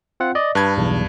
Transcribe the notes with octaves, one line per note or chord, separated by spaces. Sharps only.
C4 F4 F#5
D5 D#5
G2 B4 A5 G#6
B1 E2